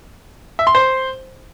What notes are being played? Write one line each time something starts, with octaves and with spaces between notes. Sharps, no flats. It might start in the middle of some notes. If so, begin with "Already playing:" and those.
E5
C6
C5